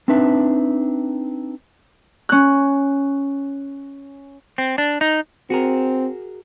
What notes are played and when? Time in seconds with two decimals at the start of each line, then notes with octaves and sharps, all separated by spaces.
0.08 C4 D4 D#4 B4 E5 A5
2.29 C#4 F#6
4.58 C4
4.78 D4
5.01 D#4
5.50 C4 F#4 G#4 A#4